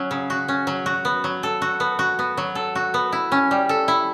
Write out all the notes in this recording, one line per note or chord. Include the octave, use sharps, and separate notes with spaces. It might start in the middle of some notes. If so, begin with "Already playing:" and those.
Already playing: F#3 C#4
C#3
F#4
C#4
F#3
F#4
B3
F#3
A4
F#4
B3
F#4
B3
F#3
A4
F#4
B3
E4
C#4
G3
A4
E4